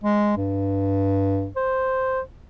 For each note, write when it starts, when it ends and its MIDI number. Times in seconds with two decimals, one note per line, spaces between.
0.04 0.36 56
0.37 1.49 43
1.56 2.21 72